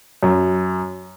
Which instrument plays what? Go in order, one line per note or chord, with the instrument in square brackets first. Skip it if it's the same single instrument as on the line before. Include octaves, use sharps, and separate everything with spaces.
[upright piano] F#2